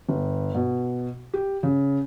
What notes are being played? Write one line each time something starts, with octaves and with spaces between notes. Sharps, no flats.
G1
B2
G4
C#3